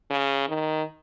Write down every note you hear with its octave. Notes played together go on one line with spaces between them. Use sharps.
C#3
D#3